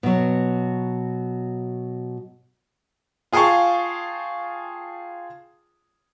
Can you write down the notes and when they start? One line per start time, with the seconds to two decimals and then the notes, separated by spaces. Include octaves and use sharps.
0.03 B2 F#3
3.33 F4 G#4 F5 G5 A5 C#6